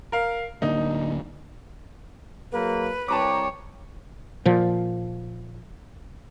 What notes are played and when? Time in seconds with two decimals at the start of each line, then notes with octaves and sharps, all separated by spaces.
0.12 A#4 F5
0.62 D1 D3 A#3 D#4
2.52 F#3 A#3 G#4 B4
3.08 C2 C#5 G5 A5 A#5 D6
4.45 A#2 F3